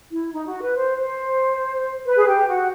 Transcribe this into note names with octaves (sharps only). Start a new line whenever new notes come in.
E4
D#4
F#4
B4
C5
C5
B4
G#4
G4
F#4